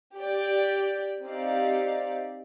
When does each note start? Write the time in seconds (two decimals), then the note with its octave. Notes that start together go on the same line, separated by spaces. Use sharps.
0.16 G4 D5 G5
1.23 C4 D#4 G4 D5 F5